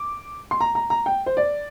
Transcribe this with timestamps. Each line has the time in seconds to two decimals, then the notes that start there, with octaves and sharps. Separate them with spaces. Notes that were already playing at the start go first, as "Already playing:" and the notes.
Already playing: D6
0.51 C6
0.60 A#5
0.75 A#5
0.90 A#5
1.06 G5
1.26 C5
1.37 D5